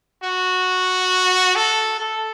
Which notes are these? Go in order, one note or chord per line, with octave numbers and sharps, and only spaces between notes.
F#4
A4
A4